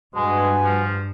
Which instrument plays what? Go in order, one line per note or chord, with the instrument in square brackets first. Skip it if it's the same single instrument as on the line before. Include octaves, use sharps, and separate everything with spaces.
[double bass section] G2 [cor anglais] G#3 [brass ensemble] F#4 B4 G#5
[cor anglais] F3